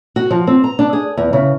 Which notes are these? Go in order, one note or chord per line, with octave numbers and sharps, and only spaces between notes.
F#4
F3
C4
A#5
D4
G#4
E2
C#3